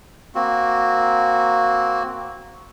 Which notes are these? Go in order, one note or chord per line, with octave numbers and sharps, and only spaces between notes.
A#3 C4 F#4